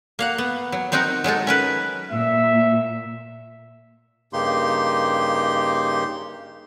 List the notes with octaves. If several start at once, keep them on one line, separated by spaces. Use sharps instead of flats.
A#3 F5 F#5
B3
F#3
F#3 C4 D#4 F#4 A#4
F#3 G#3 D#4 A4
C#4 A#4 B4
A#2 E5
G2 C#3 A#3 D#4 G4 C6